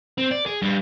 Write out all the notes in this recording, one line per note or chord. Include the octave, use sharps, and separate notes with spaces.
C4
D5
G#4
G2